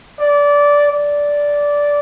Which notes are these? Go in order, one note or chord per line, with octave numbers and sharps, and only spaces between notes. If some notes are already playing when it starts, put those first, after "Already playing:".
D5
D5